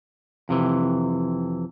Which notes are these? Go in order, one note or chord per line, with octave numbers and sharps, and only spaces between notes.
F2 C3 E3